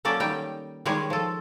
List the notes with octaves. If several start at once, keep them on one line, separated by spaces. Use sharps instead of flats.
F#3 A#3 C#4 A4 D5
D#3 G3 G5
D#3 G3 G#3 G#4 C#5
F3 A4